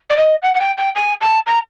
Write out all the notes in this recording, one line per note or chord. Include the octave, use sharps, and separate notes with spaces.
D5
D#5
F#5
F#5
G5
G5
G#5
A5
A#5